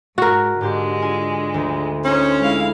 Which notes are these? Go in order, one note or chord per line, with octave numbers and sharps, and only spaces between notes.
G#2 F#4 A#4 F6
G#2 D3 G#3 G4 C6
F4 G#5
D2
C#4 D#4 C5
G#3 E4 F5